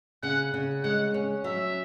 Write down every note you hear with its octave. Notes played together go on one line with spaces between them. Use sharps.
C#3 F#5
C#3
G#3 F#5
C#4
F#3 E5